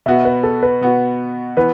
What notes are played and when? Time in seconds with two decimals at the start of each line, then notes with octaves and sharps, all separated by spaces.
0.06 B2 B3 F#4 E5
0.25 B4
0.43 A4
0.63 B4
0.81 B2 B3 F#4
1.57 E3 B3 B4